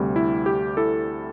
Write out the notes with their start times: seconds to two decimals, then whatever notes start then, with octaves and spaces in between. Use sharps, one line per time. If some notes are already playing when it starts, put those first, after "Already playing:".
Already playing: D2 C3 G3
0.16 E4
0.46 G4
0.77 E4 A4